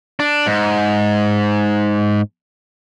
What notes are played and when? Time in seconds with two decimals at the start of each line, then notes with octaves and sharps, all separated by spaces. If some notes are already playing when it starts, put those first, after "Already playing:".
0.20 D4
0.46 G#2